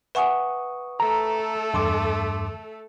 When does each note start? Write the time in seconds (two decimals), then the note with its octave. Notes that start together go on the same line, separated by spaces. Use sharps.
0.15 B4 E5 F#5 G#5 C#6 D#6
1.00 A3 A4 A#5
1.74 E2 G2 C6 D6